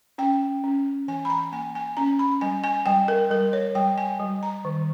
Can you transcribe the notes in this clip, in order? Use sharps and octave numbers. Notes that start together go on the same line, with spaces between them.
C#4 G5
C#4
E3 G#5
B5
A#5
A#3 G#5
G#5
C#4 A#5
B5
G3 G#5
G#5
G3 G5
A#4
G3 A#4
C#5
G3 G5
G#5
G3
A#5
D#3